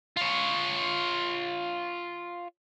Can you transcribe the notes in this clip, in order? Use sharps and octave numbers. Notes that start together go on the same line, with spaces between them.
F4 C#5